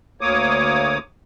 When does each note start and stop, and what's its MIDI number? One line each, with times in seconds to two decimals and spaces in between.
0.21 0.98 38
0.21 0.98 58
0.21 0.98 73
0.21 0.98 86
0.21 0.98 87